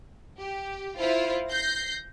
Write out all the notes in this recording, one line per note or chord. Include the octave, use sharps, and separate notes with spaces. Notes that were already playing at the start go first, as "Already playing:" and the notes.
G4
E4 F4 C5 F5
G6 A#6 C7